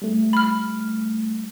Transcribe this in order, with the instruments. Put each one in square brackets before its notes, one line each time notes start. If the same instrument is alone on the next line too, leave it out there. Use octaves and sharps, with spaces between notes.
[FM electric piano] G3 A3
[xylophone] B5 F6